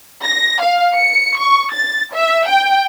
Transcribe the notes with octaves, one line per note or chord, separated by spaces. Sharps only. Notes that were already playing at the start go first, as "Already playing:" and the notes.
A#6
F5
C#7
C#6
A6
E5
G5